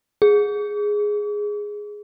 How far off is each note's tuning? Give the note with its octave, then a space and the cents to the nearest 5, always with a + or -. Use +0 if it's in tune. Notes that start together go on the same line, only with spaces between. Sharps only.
G#4 +0